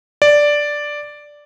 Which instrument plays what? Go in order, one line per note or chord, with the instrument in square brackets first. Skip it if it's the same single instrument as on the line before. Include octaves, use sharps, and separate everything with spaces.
[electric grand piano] D5